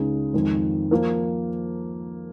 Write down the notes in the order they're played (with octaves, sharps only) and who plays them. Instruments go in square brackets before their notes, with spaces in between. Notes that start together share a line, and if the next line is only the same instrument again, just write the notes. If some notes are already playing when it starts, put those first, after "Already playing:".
Already playing: [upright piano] C#2 C#3 G#3 D#4 G#4
F2 D#3 G#3
F3 A#3